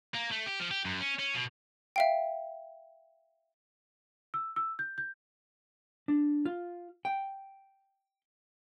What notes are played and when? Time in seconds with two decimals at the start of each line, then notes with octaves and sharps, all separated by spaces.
0.14 A#3
0.31 A3
0.46 G4
0.60 F3
0.71 G4
0.85 F#2
1.01 C#4
1.19 C#4
1.35 B2
1.96 E5 F5 G5
4.34 E6
4.56 E6
4.79 G6
4.98 G6
6.08 D4
6.45 F4
7.05 G5